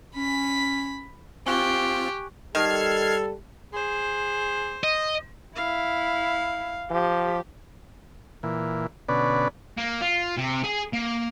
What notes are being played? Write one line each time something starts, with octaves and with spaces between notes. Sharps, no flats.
C#4 B5 B6
C4 F4 G4 G#5 C#6 F#6
D#3 G3 A4 F6 G#6 C7
G#4 C5
D#5
E4 F5
F3 G4
A#2 E3
B2 D3 C#4 B4 D5
A#3
F4
C3
G#4 G#5
A#3